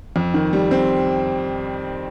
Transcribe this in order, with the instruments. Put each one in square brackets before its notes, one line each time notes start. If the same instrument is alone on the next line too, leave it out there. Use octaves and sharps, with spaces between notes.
[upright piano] F2
D#3
G3
C4